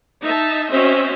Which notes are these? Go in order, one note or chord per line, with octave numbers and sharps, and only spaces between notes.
D#4 E5 A5
C4 C#4 F#4 C5 D#5 E5